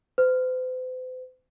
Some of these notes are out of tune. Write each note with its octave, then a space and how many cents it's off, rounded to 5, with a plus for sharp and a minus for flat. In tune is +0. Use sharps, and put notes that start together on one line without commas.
C5 -45